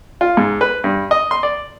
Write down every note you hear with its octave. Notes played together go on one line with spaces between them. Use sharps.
F4
G#2
B4
G2
D#5
C6
D5